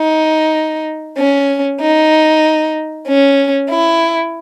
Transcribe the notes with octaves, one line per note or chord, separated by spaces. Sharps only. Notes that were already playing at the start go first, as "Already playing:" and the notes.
Already playing: D#4
C#4
D#4
C#4
E4